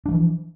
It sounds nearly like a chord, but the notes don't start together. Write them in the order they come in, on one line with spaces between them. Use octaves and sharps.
D4 G#3 F3 E3